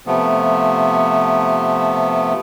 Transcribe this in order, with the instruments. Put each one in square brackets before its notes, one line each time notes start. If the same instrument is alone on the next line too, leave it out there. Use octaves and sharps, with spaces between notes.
[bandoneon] C3 F3 A3 B3